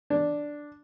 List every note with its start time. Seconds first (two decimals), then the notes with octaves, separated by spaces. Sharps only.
0.10 D4